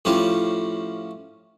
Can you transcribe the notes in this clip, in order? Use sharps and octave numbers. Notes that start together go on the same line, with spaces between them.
A2 F3 C#4 G4